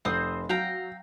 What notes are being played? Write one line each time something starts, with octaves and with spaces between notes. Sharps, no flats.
F1 C4 C5 D#6
F#3 F5 G5 A#5